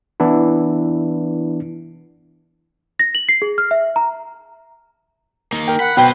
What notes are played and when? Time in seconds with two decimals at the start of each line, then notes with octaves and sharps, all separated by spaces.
0.20 E3 B3 D4 E4
2.99 A#6
3.15 F#7
3.29 C7
3.42 G#4
3.58 F6
3.71 E5
3.96 A#5
5.53 A#3 D#4
5.68 A#4 G5
5.80 F#5 B5
5.97 B1 B2 B4 C5 G5